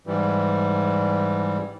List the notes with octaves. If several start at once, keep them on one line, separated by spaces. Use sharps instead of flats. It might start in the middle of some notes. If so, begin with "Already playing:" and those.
G#2 E3 G3